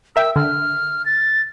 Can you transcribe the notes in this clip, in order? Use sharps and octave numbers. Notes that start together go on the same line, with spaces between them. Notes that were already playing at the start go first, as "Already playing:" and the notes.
A#4 E5 G5 E6
D3 F6
A6